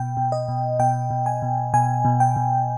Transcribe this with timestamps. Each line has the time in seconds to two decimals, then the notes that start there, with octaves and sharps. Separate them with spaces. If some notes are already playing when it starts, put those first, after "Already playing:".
Already playing: B2 G5
0.17 B2
0.32 D#5
0.48 B2
0.79 B2 G5
1.11 B2
1.26 G#5
1.42 B2
1.73 B2 G#5
2.05 B2
2.20 G5
2.36 B2